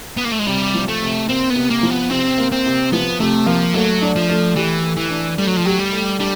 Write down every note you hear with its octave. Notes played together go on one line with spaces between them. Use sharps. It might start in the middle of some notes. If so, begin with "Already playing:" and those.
B3
A#3
A3
G#3
C3 G3
F3
A3
C3
A#3 C4
B3
C3
A#3
F3
B3
C3 C4
A#3
C4
C3
F3 B3
C3 A3
F3 A#3
F#3 A3
D4
F3
A3
E3 G4
A3
E3
D4
G3 A3
F#3
F3
F#3 G4
G3
A3
G3 D4